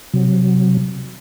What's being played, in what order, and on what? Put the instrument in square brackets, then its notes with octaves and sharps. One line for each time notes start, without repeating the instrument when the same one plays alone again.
[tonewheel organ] C3 F#3